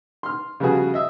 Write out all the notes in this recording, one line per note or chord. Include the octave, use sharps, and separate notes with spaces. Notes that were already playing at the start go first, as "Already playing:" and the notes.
C6 F6
C#3 F3 G3 B3 F#4 G#4
D#5 E5